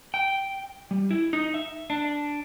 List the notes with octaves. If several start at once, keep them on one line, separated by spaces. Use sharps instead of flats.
G5
G3
E4
D#4
E5
D4